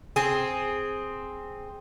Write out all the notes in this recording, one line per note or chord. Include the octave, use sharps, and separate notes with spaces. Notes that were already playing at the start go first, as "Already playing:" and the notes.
C4 G#4